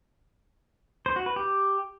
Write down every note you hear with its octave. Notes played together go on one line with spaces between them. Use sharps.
C5
F#4
B4
G4